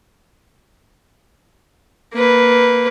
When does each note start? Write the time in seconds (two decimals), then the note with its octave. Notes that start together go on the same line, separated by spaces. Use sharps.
2.14 A#3 B4